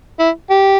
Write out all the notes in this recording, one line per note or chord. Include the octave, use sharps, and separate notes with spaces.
E4
G4